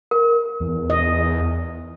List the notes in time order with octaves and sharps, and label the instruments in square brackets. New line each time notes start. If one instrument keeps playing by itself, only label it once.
[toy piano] A#4
[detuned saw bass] E2
[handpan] D#5